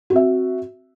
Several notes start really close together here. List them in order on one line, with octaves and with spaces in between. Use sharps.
F#4 C4 E5